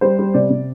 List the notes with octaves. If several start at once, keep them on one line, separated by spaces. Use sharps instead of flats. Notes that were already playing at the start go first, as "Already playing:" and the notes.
G3 C5
G3
C3 D5
C3